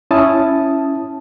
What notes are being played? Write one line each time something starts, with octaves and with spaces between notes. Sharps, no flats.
C#4 E4 A5 D#6